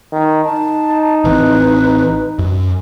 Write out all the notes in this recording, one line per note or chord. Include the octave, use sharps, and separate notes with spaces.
D#3
D#4 A5
A1 E3 C4 B4
F#2